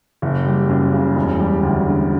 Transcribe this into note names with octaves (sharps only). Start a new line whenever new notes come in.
F#1
G3
F#2
C#3
E1
G3
D2
D3